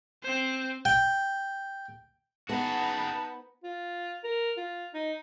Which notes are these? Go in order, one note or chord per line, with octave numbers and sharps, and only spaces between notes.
C4 C5
G5
B3 D#4 F#4 G#4 B4 A5
F4
A#4
F4
D#4